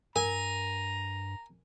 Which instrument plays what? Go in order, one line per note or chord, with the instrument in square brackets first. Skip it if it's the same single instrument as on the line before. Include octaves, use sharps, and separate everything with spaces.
[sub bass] G2 [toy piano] A#4 [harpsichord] G#5 [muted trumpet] A#5